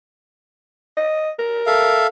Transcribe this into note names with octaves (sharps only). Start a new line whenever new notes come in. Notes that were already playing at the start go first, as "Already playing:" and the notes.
D#5
A#4
A4 E5 F5